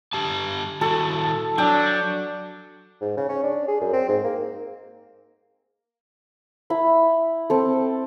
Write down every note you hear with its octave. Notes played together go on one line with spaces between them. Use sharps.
D3 G4 A5
D#3 E4 F#4 A4
F#3 D4 G5
G#2
C#3
C#4
D4
G#4
F#2
C4
G#2
A#3
E4 B5
C4 A4